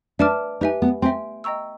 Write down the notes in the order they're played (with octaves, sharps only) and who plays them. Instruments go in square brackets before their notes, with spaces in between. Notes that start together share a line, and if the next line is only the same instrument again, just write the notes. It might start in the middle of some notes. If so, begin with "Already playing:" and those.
[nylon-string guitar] D4 [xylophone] B4 E5 A5 D6 F6
[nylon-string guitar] D#4 [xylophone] G4 B4 E5 G#5
[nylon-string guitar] B3
[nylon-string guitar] C4 [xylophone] E5 G#5 C6
[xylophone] D#5 G5 A#5 C#6 E6